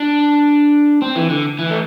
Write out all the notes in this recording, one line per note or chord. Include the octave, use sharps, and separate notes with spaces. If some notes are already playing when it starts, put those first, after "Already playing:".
Already playing: D4
C4
E3
D3
E3
A3